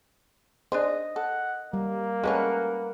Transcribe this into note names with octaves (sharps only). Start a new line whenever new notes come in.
D4 G#4 C5 D#5
A4 F#5
G3 A#3
G#3 A3 C#4 A#4 B4 F#5